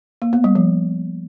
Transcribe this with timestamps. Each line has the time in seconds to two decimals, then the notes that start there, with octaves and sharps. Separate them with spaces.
0.22 A#3
0.33 B3
0.44 G3
0.55 F3